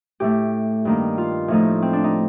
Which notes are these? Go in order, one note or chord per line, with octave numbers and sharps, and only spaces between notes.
A2 A3 G4
G2 D#3 A#3
F4
A2 F3 A3 D#4
C4
D4
D#4